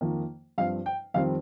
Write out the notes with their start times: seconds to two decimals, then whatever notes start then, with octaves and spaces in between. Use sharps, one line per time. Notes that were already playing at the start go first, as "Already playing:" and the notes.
0.01 F2 D#3 A#3
0.58 G2 F3 C4 F5
0.86 G5
1.14 F2 D#3 G3 C4 F5